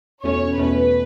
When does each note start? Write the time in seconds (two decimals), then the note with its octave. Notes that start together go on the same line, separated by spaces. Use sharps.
0.24 E2 B2 A3 C#4 C#5
0.58 E2 B2 A3 C#4 B4